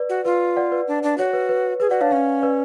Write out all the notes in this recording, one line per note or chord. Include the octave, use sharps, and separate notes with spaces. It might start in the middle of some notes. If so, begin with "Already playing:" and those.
Already playing: B4 D5
F#4
F4 B4
D5 F#5
B4 D5
D4
D4
F#4 C#5
B4
B4
G#4 B4
F#4 D5 F#5
D4 C#5 F5
C#4 C#5 F5
B4 D5